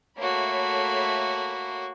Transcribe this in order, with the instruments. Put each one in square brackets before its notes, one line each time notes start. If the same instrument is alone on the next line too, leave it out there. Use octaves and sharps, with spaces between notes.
[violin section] A3 C#5 B5 [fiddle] A#3 F#4